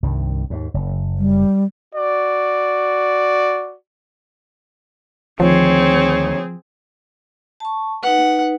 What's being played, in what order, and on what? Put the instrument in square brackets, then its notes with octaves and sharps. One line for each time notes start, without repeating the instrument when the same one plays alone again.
[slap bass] C2 G2 D#3
D#2 G#2
F#1
[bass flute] G3
[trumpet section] F#4 D5
[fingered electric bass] D2 D#3 [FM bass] F3 [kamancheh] C4 G#4 [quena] C#5
[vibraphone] A5 C#6
[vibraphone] D#4 B4 [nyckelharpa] F#5